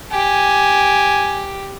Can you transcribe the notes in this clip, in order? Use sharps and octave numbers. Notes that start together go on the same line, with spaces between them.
G4 G#5